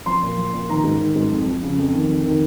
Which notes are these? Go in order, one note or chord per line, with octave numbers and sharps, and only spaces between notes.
F3 C6
A#2
F3
A#2
D#3 A#5
G#2
D#3
G#2
F2
F3
C#3
F2
D#3
F2
D#3